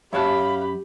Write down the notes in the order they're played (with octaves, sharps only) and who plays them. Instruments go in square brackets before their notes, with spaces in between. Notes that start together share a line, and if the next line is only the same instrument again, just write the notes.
[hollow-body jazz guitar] F#2 C#5 A5 [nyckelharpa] G4 [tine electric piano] E5 F5 F#6 [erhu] B5